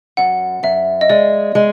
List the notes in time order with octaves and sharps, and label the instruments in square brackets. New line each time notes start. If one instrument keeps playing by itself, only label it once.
[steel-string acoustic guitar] F#2 [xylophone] F#5
[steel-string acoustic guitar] F#2 [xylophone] E5
[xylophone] D#5
[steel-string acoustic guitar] G#3 [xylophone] D5
[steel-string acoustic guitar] G#3